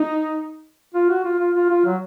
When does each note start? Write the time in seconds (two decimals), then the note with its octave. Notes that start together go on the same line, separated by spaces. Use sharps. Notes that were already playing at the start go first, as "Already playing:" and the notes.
Already playing: D#4
0.94 F4
1.09 F#4
1.24 F4
1.39 F4
1.55 F4
1.70 F4
1.85 F#3